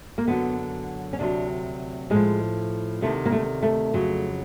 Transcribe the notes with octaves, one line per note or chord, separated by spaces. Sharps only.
A#3
F#2 D3 F#3 B3
C#4
D2 C3 D#3 F#3 D4
A2 F3 G#3
D2 C3 D#3 A3
A#3
A3
A3
F2 C#3 F#3